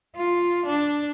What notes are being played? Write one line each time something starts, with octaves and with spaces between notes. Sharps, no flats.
F4
D4